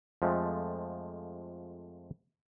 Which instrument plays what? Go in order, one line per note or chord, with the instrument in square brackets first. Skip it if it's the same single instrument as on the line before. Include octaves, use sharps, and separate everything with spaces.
[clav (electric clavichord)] F2 F3 G#3 A3